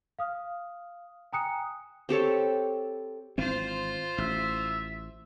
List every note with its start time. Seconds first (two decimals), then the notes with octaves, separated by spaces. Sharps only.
0.19 F5 D#6 F6
1.33 G5 G#5 A#5 D#6 F#6 C#7
2.09 C4 G4 A4 C#5
3.38 G#1 E3 C4 F4 C5
4.18 A1 E5